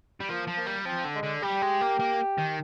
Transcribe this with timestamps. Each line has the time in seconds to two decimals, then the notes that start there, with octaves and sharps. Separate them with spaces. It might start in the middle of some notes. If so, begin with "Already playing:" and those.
0.20 G3
0.28 F3 A#3
0.47 F3
0.57 A#3
0.66 G3
0.85 F3 C4
1.05 D3
1.14 G#3
1.23 D3
1.42 G3 G4
1.62 G#3
1.81 A#3
1.99 A#3
2.38 D#3